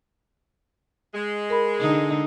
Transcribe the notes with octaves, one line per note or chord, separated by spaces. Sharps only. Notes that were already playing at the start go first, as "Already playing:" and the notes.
G#3
A#4 B5
D3 D#4